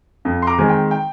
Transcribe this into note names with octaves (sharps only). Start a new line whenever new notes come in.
F2
C6
A#5 D6
D#3 G#3 C4 G#5
G5
G5